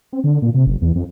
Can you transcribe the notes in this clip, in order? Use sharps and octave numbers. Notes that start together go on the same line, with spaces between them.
C4
D3
A#2
C3
F#1
E2
F2